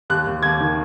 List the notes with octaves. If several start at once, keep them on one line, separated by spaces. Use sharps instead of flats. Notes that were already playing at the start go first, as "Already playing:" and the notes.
D#2 F#6
D#2
D#2 G#6
D#3